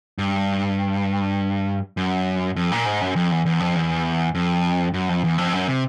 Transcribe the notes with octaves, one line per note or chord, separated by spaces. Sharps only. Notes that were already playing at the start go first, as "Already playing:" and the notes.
G2
F#2
F2
A#2
G#2
F#2
F2
E2
E2
F2
E2
F2
F#2
F2
E2
F2
F#2
C3